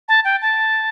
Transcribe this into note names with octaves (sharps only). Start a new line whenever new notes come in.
A5
G5
A5